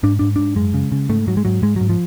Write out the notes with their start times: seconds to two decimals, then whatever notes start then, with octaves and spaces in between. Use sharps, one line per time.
0.03 G#2 D4
0.19 G#2 D4
0.36 G#2 D4
0.56 F#2 G#3
0.74 C#3
0.92 C#3
1.09 G#2 A3
1.27 G#2 F#3
1.37 G#3
1.45 G#2 F#3
1.62 G#2 G#3
1.76 G#2 F#3
1.89 F3